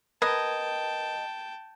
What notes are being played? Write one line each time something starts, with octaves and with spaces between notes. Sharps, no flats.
A#4 B4 D#5 G5 A5 G#6